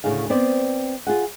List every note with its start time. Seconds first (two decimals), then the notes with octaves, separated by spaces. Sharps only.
0.04 D2 A2 C#3 G#4 F5
0.30 B3 C4 C5 D5
1.07 F4 G#4 F#5